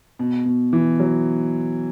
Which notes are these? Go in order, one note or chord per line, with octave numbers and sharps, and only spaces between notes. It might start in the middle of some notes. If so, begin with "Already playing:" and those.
B2
B2
E3
F#3